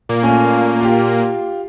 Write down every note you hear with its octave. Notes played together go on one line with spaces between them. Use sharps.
A#2 A#3
A3 C#4 G#5
F4 G4